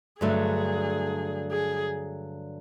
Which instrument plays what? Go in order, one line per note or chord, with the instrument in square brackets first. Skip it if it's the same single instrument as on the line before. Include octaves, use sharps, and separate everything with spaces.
[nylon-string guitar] G2 D3 F#3 A3 [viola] G#4
[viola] G#4